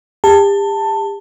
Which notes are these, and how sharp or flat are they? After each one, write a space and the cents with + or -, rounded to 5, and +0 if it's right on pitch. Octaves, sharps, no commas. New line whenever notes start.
G4 +40 A5 +15